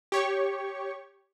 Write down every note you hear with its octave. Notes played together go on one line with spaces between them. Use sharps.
G4 C#5 C#6